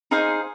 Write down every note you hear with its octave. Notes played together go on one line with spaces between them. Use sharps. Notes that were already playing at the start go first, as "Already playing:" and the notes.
D#4 G#4 C5 F5